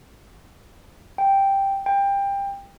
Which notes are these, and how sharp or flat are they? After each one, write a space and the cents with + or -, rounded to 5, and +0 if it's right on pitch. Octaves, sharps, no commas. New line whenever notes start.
G5 +0
G5 +20